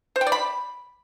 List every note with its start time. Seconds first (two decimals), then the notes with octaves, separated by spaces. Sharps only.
0.16 C5
0.21 G5
0.27 D5
0.32 B5